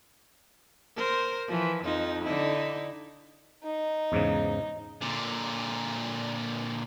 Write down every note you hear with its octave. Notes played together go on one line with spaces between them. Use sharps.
A#4 C5
E3 F3
F2 F3 D#4
D3 D#4 E4
D#4
E2 G#2 C#3
A#2 D3